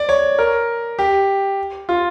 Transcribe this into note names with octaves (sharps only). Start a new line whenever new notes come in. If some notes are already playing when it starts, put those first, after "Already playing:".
Already playing: D5
C#5
A#4
G4
F4